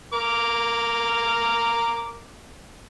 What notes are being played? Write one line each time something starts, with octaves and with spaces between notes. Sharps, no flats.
A#4 D6